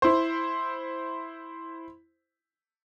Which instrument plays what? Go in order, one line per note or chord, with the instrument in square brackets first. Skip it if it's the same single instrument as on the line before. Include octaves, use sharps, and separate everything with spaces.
[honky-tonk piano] E4 C5